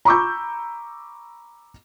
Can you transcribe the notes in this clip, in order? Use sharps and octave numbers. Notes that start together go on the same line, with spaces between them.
A#5 B5 C#6 D6 E6 G6